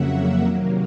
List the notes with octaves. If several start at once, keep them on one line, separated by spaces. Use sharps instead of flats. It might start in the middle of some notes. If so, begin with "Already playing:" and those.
Already playing: F2 C#3 F#3 A#3 E5 F#5
C3 D#3 F#3 A#3